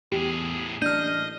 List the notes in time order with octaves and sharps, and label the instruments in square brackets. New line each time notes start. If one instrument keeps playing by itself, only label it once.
[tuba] E2 [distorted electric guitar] A2 G#4 [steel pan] G4
[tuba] A1 [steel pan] A#3 D4 [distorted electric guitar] D#5 [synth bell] F6 G6